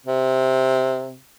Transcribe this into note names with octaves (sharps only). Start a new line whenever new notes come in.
C3